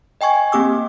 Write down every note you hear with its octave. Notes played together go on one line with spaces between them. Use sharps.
D#5 G5 G#5 C#6 G#6
A#3 C4 G4 D6 E6